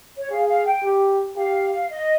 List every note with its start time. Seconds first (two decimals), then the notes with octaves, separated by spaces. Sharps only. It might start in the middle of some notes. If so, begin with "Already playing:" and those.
0.18 C#5
0.31 G#4 F5
0.48 F5
0.66 G5
0.84 G4
1.36 G4 F5
1.89 D#5